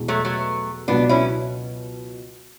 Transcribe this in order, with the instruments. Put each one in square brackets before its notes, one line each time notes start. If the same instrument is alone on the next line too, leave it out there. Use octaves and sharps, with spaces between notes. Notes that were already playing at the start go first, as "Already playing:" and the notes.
Already playing: [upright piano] E2 B2 G#3
[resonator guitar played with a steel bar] F#3 A3
F#3 A3
[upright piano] C#2 B2 F#3 [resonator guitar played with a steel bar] B3 D4
[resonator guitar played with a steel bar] C#4 E4